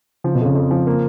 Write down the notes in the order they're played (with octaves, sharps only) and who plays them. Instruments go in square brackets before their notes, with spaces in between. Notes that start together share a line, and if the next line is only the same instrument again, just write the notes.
[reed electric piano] C#3 [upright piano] F3
[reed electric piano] B2
[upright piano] F2
[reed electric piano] C#3
[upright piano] F2
F3
A#3